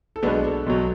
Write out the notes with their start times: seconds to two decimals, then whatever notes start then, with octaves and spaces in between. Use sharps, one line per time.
0.16 A4
0.23 B1 B2 G#3 B3 D4 B4
0.44 A4
0.66 B1 B2 F#3